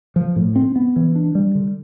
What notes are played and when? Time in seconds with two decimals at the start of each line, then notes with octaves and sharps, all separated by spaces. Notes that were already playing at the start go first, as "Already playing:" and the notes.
0.16 F3
0.36 A2
0.56 C4
0.76 B3
0.96 E3
1.16 D4
1.35 G3
1.55 D3